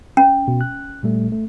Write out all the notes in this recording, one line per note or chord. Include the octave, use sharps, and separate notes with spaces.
C#4
B2
F#6
A#2 G3 A3
A3